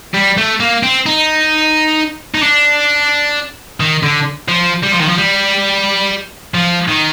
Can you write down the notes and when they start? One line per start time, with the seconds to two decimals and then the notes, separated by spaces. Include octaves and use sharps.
0.14 G3
0.37 A3
0.60 A#3
0.83 C4
1.06 D#4
2.34 D#4
2.43 D4
3.80 D#3
4.03 D3
4.48 F3
4.83 G3
4.92 F3
5.00 D#3
5.08 F3
5.17 G3
6.54 F3
6.89 D#3